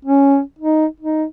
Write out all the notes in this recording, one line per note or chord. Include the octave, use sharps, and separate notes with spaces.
C#4
D#4
D#4